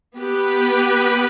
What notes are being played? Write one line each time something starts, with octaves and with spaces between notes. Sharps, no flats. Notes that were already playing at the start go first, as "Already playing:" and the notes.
B3 G4 B4